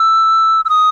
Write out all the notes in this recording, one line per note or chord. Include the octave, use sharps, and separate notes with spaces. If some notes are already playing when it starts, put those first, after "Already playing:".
Already playing: E6
E6
D#6